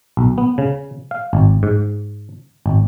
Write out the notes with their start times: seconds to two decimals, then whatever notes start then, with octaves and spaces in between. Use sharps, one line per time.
0.17 B1
0.38 B3
0.58 C#3
1.11 F5
1.33 G#1
1.63 G#2
2.66 G#1